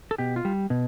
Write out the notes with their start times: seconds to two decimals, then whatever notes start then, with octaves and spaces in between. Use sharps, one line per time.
0.11 A4
0.18 B2 G4
0.36 F4
0.45 G3
0.70 B2